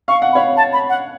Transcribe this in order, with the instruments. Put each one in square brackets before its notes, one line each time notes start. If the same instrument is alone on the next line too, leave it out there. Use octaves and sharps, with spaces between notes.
[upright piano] F5 [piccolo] C#6
[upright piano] F#5
[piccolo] B5
[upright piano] C#5 F5
[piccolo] A5
B5
F#5